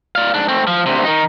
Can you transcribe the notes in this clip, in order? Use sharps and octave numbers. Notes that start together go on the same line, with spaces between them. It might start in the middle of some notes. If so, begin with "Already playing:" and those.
D5 F5
G#2 D4
A3 C4
F3
D2 C3
D#3 D#4